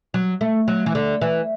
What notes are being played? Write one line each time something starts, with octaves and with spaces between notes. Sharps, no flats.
F#3
A3
F#3
E3
D3
E3